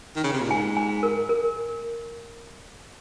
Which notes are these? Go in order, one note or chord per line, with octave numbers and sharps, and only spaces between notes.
D#3
C#3
C3
A#2
G#2 G#5
G#5
A#4
A#4